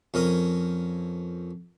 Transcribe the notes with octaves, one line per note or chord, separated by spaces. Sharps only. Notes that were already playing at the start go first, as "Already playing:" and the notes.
F2 C#4 A#4 D#6